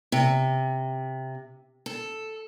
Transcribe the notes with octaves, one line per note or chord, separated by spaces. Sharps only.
C3
A4